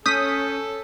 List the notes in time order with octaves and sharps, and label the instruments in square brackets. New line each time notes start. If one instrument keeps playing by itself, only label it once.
[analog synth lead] C#4 [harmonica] A4 [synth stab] D#6 B6 [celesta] G6